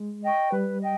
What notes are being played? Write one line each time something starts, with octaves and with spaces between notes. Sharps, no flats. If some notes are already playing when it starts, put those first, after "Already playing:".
Already playing: G#3
D#5 G5 C#6
G3 B4
D#5 G5